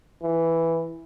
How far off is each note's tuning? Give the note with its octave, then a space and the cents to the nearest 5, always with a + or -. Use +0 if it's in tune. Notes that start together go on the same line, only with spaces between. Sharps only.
E3 +0